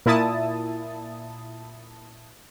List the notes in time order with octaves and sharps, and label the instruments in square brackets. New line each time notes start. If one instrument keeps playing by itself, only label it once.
[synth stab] A#2 E4 A5 D#6